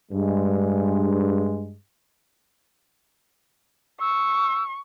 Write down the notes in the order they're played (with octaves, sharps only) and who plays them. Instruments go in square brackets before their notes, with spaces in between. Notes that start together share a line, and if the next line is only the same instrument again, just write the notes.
[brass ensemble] G2 G#3
[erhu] C#6 [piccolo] E6